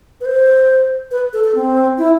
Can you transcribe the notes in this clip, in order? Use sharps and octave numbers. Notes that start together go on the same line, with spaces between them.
B4
C5
B4
A4
A4
C4
E4